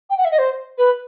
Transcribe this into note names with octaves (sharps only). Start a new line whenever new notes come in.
G5
F#5
E5
D#5
C5
B4